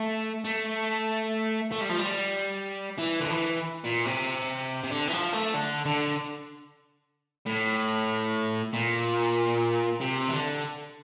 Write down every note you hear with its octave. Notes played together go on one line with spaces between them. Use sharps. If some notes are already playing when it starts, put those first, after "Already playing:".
Already playing: A3
A3
A3
G3
F3
G3
E3
D3
E3
A#2
C3
C3
D3
E3
F3
A3
D3
D3
A2
A#2
C3
E3
D3